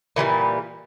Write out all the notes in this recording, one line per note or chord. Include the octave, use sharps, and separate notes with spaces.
A#2 E3 F#3 G3